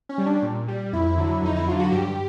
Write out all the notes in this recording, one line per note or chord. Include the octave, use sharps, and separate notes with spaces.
C#4
G3
D4
A#2
G3
F2 E4
D3 F#3
F2 D#4
E4
D3 F#3 F4
F#4
G2 G4